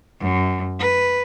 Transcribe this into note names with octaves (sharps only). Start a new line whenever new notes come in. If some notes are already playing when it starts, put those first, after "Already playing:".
F#2
B4